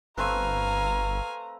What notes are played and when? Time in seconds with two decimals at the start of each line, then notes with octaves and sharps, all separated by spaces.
0.18 G1 A3 C4 B4 F5 G#5 A#5